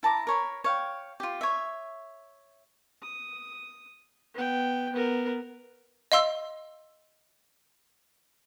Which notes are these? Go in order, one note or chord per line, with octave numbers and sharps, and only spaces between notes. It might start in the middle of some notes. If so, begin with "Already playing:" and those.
E4 A5 A#5 D6
A#4 C#5 B5
C#5 F5 G5
F4 G4
C#5 E5
D#6
B3 G5
B3 A#4
D#5 F5 C6 E6